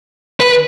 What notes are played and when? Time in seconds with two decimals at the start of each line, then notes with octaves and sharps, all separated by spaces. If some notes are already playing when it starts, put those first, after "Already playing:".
0.40 B4